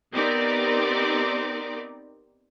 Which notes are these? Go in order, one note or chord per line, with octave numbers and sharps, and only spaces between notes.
B3 C4 D#4 G4 A#4 D5